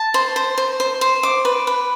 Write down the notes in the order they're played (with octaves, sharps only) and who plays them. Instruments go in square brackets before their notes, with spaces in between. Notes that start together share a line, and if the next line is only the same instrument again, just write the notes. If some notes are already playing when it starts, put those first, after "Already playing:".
Already playing: [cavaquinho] A5
C5
C5
C5
C5
C5
D6
B4
B4